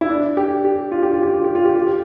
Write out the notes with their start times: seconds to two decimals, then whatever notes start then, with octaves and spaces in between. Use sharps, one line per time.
0.01 E4
0.09 D4
0.37 G4
0.65 G4
0.92 F4
1.03 G4
1.13 F4
1.23 G4
1.34 F4
1.44 G4
1.55 F4
1.65 G4
1.75 F4
1.87 G4